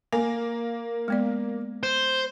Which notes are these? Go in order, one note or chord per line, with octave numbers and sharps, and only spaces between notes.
A#3 G#5
G#3 B3 D5
C5